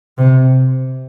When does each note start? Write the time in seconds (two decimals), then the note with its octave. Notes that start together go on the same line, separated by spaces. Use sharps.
0.18 C3